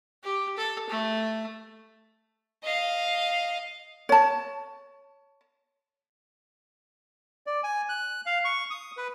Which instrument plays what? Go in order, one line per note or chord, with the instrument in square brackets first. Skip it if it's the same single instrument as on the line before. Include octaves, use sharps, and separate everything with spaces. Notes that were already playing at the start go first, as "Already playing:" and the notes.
[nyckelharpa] G4
A4
A3
[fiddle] D#5 F5
[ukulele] C#5 A5
[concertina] D5
G#5
F#6
F5
C#6
D#6
B4